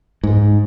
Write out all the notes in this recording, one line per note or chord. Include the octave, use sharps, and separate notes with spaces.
G#2